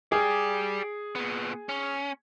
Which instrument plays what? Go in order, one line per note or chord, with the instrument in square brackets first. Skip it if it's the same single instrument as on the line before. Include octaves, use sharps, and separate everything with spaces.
[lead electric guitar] G4 D5 [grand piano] G#4
[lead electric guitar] A#2 B3
C#4